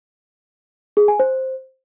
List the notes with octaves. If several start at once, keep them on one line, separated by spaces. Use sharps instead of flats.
G#4
G#5
C5